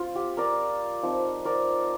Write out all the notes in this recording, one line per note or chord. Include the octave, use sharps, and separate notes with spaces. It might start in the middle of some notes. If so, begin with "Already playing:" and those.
Already playing: C4 F4
G4
A#4 D5
F3 C4 D#4
A#4 D5